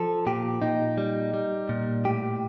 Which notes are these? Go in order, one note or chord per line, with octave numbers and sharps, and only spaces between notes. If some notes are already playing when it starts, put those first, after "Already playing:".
Already playing: F3 A4
A#2 G4
A#2 D#4
G3
G3
A#2
A2 G4